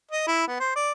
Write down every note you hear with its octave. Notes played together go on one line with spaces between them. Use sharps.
D#5
E4
B3
C5
D5